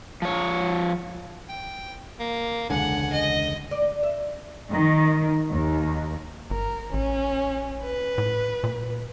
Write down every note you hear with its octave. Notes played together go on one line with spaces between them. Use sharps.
F3 C#5
G5
A#3
E1 C#2 D3 F#5 G#5
D#5
D5
E5
D#3
D#2
G1 A#4
A1 C#4
B4
A2
A#2